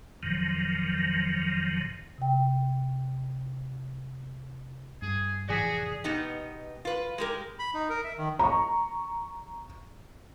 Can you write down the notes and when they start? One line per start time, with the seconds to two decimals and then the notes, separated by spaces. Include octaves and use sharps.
0.23 F2 A#2 D#3 F3 F#3
2.18 C3 G5
5.02 G2 G#4
5.49 F1 A2 E3 F#4 G#4 D5 G#5 B6
6.04 B2 B3 D#4 G4
6.85 F4 B4
7.18 G#3 G4 A#4
7.59 B5
7.74 D#4
7.90 A#4
8.04 E5
8.18 D#3
8.39 A#5 C#6